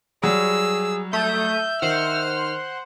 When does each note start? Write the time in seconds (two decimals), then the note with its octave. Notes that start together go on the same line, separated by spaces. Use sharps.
0.23 F#3 G3 G#4 E6
1.13 A3 E5 D#6 G6
1.82 D#3 C5 F#5 F6